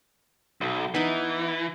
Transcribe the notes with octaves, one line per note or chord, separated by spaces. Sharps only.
B1
E3 B3 D#4